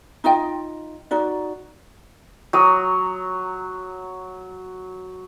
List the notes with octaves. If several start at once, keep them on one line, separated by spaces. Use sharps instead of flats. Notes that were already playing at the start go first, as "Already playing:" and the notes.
D#4 F4 D#5 G5
D#4 F#4 D5
F#3 D#6